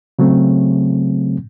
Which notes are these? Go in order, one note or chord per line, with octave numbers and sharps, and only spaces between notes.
C#3 F#3 A3 C4